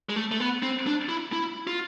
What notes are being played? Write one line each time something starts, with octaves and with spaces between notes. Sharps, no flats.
G#3
A3
A3
B3
C4
D4
E4
E4
F4